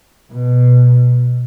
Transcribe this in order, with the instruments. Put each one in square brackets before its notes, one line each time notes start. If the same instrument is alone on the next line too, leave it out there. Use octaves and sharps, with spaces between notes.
[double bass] B2